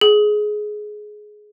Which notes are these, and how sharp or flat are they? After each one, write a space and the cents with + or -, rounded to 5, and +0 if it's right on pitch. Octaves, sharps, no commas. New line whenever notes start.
G#4 +15